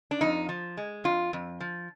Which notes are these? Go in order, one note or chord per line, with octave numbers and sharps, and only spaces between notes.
D4
F2 D#4
F3
G#3
F2 F4
F2
F3